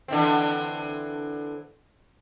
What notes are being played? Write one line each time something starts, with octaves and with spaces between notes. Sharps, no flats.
D3 E3 C4